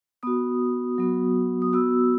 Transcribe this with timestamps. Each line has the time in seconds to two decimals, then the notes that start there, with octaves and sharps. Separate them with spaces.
0.23 B3 F#4 D#6
0.98 F#3 B3 F#4
1.62 D#6
1.73 B3 F#4 E6